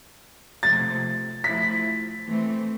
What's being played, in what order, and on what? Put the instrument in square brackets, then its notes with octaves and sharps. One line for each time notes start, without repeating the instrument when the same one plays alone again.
[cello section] C3 F3 A3 [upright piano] A6
[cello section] F3 A3 E4 [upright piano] B6
[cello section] E3 A3 C4